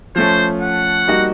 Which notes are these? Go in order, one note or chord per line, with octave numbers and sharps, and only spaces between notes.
F3 A3 C#4 C5
F#5
G3 A#3 D#4 F#4